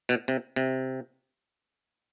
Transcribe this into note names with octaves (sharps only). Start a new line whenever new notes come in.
B2
C3
C3